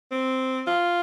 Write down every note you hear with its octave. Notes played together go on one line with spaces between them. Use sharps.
C4
F4